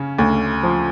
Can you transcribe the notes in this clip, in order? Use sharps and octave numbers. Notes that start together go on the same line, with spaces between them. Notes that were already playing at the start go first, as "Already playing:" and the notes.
Already playing: C#3 C#4
D2
F3